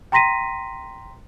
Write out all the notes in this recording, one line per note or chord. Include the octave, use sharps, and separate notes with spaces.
G5 A#5 C6 A#6 B6 D#7